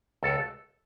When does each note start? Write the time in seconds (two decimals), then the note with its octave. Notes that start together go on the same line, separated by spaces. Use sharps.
0.23 C#2 A4